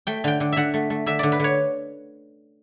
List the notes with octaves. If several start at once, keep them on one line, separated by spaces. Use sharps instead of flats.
A3 G5
D3 G5
D3
D3 E5 F#5
A3
A3
D3 E5
D3 D5
B4
D3 C#5